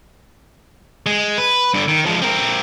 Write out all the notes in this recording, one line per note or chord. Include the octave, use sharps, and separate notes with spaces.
G#3
B4
G2 D3
D#3
F3 G#3
C4 A#4